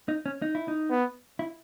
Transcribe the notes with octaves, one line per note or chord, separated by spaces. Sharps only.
D#4
C#4
D#4
E4
D#4
B3
E4